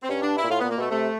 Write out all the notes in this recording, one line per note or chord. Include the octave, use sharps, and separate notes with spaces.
C4
G2 C#4
D4
E4
A#2
A2 F4
A#2 B3
A#3
B2 A3
C3 A3